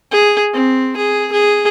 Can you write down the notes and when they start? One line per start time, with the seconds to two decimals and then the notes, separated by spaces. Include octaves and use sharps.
0.11 G#4
0.53 C4
0.97 G#4
1.32 G#4